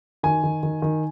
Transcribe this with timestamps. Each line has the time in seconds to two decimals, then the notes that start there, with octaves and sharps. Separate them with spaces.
0.23 D#3 G#5
0.43 D#3
0.63 D#3
0.82 D#3